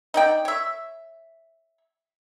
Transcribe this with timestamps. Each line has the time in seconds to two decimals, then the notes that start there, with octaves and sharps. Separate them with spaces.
0.14 D#4 D5 G5
0.45 C#5 E5